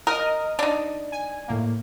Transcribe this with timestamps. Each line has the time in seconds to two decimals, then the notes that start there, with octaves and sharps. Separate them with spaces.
0.07 A#4 D#5 D#6
0.59 D4 D#4
1.12 G#5
1.48 A2 A#3